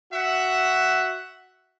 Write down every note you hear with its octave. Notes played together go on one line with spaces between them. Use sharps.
F#4 E5 F#5